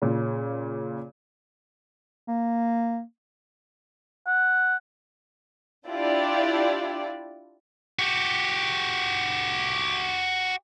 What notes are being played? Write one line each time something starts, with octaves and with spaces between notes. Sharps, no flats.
A#2 C#3
A#3
F#5
D4 E4 F4 G4 D5
F#4 G4